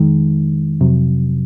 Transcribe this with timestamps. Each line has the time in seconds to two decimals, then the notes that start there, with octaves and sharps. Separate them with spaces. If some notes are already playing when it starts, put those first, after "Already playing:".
Already playing: F2 D#3 G#3
0.81 F2 C3 F#3